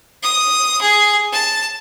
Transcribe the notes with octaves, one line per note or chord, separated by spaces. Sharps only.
D#6
G#4
A5